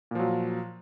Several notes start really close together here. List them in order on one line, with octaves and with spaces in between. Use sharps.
A#2 F3 F#3